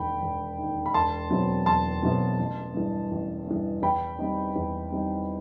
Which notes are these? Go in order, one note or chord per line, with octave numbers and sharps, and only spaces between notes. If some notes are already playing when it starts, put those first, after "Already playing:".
Already playing: E1 D#2 D#3 G5 B5
E1
D#2 D#3
B5
E1 A5 C6
E2 B2 F#3 C4
E1 A5 C6
E2 B2 F#3 C4
A1
G2 E3
A1
G2 E3
E2 G5 B5
D#3 G3 C4 D#4
E2
D#3 G3 C4 D#4